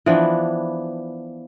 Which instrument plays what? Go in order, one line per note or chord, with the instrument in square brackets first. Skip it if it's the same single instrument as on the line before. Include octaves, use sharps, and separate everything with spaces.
[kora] E3 F3 B3 D4